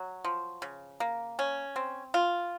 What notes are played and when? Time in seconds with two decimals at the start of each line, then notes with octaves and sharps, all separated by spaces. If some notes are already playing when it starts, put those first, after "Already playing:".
Already playing: F#3
0.24 F3
0.62 C#3
1.00 A#3
1.39 C#4
1.76 C4
2.14 F4